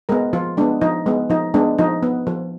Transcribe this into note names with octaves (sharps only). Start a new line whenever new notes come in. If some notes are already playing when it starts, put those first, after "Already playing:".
G#3 B3 A#4
F3 F4
G#3 B3 D4
F3 D#4
G#3 B3
F3 D#4
G#3 B3 D4
F3 D#4
B3
F3